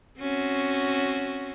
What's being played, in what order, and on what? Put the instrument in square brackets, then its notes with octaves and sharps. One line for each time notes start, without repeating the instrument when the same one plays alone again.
[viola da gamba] C4 C#4 F#4